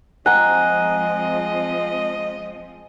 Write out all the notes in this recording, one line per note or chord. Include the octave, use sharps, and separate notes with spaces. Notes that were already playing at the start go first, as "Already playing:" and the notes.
F3 G#3 C4 D#5 F#5 G#5 A#5 F#6